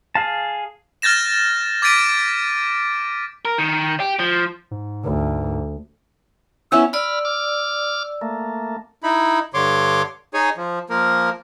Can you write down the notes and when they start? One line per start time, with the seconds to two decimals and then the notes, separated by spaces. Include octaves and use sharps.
0.15 G#4 F5 A5
1.02 F6 G6 A6 A#6 E7
1.82 D6 G#6 A6 B6 D7 D#7
3.45 A#4
3.58 D#3
4.00 G4
4.19 F3
4.71 G#2
5.04 D2
6.72 B3 C#4 E4 E6
6.93 D5 B5 E6 F6
7.25 D6 F6
8.21 A3 A#3
9.03 D#4 E4 B5
9.54 G2 D3 C#5 C6 D6
10.34 D#4 G#4 C#5 G#5
10.57 F3
10.90 F3 A#3 A#4